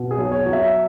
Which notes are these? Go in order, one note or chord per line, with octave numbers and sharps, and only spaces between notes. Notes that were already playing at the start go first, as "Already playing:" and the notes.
Already playing: B2
G#4
B1
C#5
F#3
E5